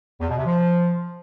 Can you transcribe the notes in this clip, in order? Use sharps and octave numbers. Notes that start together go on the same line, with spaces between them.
E2
B2
C3
F3